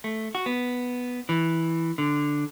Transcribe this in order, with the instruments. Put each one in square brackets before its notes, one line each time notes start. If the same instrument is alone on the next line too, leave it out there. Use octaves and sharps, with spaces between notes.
[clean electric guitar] A3
F#4
B3
E3
D3